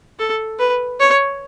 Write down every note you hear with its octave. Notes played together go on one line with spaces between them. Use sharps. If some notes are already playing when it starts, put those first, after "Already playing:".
A4
B4
C#5